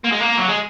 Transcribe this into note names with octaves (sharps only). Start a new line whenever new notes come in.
A#3
G#3
A#3
F#3
G#3